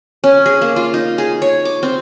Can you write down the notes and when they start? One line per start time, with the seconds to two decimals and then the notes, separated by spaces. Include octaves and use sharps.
0.24 C#4
0.46 G#4
0.61 A#3
0.76 F4
0.94 D#4
1.18 G#4
1.42 C#5
1.65 D6
1.83 C4